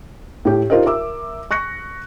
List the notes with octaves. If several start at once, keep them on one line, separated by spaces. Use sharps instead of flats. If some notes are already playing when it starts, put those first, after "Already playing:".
A2 G4
D#4 F4 G4 A#4 C5 D#5
A#4 E5 D6 E6
C#6 F#6 A#6 C#7